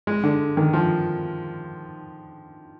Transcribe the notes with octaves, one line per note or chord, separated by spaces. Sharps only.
G#3
D3
D#3
F3